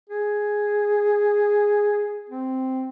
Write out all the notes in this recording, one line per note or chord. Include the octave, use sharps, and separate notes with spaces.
G#4
C4